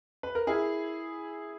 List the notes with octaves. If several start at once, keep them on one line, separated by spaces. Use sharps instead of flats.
B4
A#4
E4 G#4